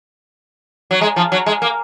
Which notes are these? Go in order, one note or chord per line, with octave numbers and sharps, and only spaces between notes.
F#3
G#3
F3
F#3
G#3
A#3